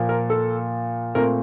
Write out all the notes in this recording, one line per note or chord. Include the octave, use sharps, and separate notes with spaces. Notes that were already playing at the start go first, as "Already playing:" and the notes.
Already playing: A#2 F3 A#3
A#4
A4
A#2 A3 C4 A#4